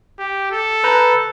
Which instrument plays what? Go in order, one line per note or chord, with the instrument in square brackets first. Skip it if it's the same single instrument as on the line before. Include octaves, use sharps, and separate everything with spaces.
[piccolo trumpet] G4
A4
[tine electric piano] B4 A#5 G6